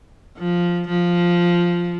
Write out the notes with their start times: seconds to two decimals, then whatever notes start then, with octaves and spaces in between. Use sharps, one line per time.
0.38 F3
0.88 F3